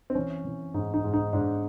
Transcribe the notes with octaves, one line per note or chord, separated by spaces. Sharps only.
C4
E3 C#4
E3
G#2 D#4
D#4
G#2
D#4
G#2 D4